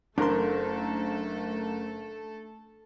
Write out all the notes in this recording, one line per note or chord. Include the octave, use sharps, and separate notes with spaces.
F#1 A3 D4 A4 A#4 C6